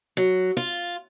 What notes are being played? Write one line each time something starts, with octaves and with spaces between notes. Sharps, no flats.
F#3
F4